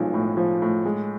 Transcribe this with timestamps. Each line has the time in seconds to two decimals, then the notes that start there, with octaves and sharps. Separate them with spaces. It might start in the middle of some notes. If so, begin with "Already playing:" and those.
Already playing: B1 F3 G#3
0.14 A2
0.37 F3
0.62 A2
0.85 G#3